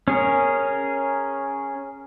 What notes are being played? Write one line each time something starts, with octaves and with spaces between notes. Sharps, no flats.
C#4 G#4 A#4